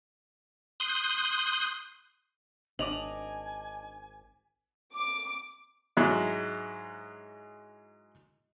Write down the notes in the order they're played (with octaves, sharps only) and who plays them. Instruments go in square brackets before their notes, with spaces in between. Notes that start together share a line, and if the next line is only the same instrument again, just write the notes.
[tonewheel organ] C6 D#6 F#6 G6
[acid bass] G#1 [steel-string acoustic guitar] D4 D#5 [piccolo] G#5 [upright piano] D6 F7 F#7
[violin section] D6
[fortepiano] G#2 F#3 G#3 E4